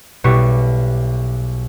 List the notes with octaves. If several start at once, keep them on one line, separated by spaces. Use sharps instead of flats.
B1 B2 G3 B3 E4 C#6